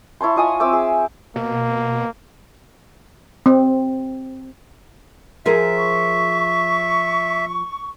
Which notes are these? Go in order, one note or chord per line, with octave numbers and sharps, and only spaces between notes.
E4 C#5 A5 C6
F4 D#5 G#5 D#6
C4 E5 D6 E6
G#4
B2 A#3
C4
F3 G#4 A#4 E5
C#6